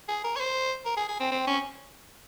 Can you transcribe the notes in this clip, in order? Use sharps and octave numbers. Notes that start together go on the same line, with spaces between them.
G#4
A#4
C#5
C5
A#4
G#4
G#4
C4
C4
C#4